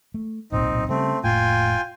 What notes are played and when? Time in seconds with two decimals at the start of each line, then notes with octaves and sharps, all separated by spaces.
0.14 A3
0.52 D1 B1 A#2 C4 D#4
0.89 C#3 G3 A3 C4
1.24 F1 A2 A#3 F4 G5 G#5